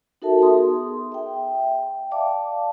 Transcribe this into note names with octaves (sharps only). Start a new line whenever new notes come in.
D#4 F#4 A4 A#4 E5 A5
B3 G#4 C6 D#6
E5 G5
D5 F5 A5 D6